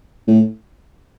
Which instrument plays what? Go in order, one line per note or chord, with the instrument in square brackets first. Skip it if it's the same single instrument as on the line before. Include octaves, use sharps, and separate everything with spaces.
[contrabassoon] A2